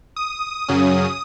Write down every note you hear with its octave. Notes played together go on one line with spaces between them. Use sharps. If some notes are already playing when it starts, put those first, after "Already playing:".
D#6
F#2 C#3 F#3 C#4